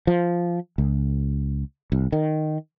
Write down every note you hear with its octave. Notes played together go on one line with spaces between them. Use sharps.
F3
C#2
C2
D#3